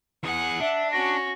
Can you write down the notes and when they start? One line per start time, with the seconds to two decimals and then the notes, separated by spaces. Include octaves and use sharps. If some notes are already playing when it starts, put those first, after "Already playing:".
0.23 E2 G#4 F#5
0.60 D4 E5
0.92 C#4 F#4 A#6